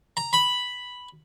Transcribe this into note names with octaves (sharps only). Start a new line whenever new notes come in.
A#5
B5